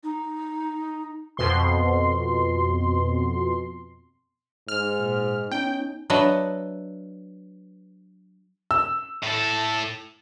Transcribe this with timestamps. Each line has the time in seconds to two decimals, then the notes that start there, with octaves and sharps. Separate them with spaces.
0.03 D#4
1.37 F2 B2 C6
4.68 G#2 F6
4.99 A#2
5.51 B3 C#4 D#4 G5
6.10 F#3 D4 B4 D#5 E5
8.71 E6
9.23 A2 A4